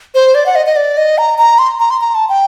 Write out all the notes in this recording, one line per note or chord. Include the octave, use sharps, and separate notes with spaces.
C5
D5
F#5
D#5
D#5
D5
D#5
A#5
A#5
C6
A#5
C6
A#5
A5
G5